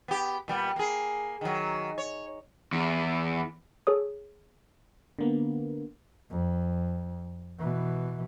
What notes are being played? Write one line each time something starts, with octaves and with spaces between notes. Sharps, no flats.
B3 G4
A#2 G3 B3
A#3 G#4
D#3 F#3
C#5
E2
G#4 A4 C#5 D#6
D3 A#3 B3
F2
B2 E3